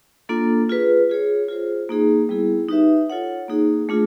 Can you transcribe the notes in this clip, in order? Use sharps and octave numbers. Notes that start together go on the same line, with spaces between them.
A#3 D4 F4 A4
F4 G#4 B4
F4 G#4 C#5
F4 G#4 C5
A#3 D#4 G#4
G3 B3 E4 G#4
D#4 G4 B4 E5
F4 A4 C#5 F#5
A#3 D#4 G#4
A3 D4 F4 G#4